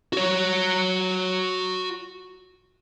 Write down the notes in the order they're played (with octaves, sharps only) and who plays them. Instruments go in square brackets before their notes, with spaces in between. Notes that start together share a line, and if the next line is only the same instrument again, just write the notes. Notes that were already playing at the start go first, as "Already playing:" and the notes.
[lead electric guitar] F#4 C#5